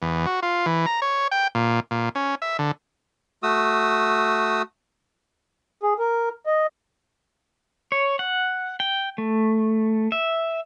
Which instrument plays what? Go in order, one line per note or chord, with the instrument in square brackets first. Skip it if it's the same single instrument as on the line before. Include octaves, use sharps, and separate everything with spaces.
[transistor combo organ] E2
F#4
F4
E3
A#5
C#5
G5
A#2
A#2
C#4
E5
D3
[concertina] A3 F#4 D#6 E6
[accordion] G#4
A#4
D#5
[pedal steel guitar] C#5
F#5
G5
A3
E5